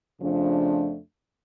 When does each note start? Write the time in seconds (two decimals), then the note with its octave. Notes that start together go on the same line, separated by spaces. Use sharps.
0.20 F2 C#3 F3 A3 D4